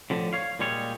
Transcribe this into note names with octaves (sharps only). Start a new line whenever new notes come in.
A2 D3 F3
C#5 F5
A#2 G3 G#3 C#5